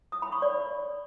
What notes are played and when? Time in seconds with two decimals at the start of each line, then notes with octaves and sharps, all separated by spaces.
0.12 D#6
0.22 B5
0.32 C#6
0.42 D5